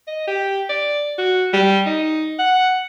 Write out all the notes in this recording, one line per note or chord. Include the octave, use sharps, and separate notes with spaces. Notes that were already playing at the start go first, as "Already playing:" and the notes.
D#5
G4
D5
F#4
G3
D#4
F#5